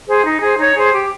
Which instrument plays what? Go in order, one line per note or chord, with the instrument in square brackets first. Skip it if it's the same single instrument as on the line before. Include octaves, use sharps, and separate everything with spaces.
[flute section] G#4 C5
D#4
G#4 C5
D#4 C#5
G#4 C5
G4